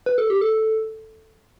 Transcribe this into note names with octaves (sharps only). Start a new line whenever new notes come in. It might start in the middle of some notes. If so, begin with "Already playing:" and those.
B4
A4
G4
A4